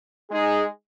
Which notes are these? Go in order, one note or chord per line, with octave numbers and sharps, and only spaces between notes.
G#3 D#4 G#4